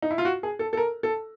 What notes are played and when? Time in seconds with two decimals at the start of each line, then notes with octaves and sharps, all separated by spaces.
0.02 D#4
0.11 E4
0.18 F4
0.25 F#4
0.43 G#4
0.59 A4
0.73 A4
0.77 A#4
1.03 A4